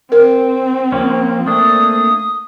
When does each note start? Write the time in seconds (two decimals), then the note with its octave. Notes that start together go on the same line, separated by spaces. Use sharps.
0.12 C4 A#4
0.92 F3 A#3 C#4
1.46 A3 A#3 D4 D#6